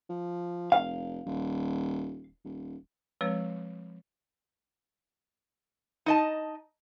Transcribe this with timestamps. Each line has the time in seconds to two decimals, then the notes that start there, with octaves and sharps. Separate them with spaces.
0.09 F3
0.72 F1 F5
1.26 D#1
2.44 D#1
3.21 F3 G#3 C4 B4 C#5
6.06 D#4 D#5 A5